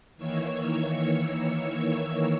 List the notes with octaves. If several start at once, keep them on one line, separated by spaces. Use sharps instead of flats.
D#3 E3 A#3 C#5 C#6 E6